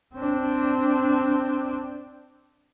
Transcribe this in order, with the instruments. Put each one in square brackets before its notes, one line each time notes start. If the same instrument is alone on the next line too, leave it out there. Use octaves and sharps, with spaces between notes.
[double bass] C4 D4